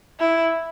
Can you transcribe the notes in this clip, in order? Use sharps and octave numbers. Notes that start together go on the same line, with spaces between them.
E4